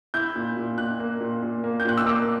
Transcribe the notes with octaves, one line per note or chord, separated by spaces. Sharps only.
E4 G6
A#2
A#2
A#2 F#6
A#3
A#2
A#2
A#3
G6
A#2 F#6
E6
A#3 D6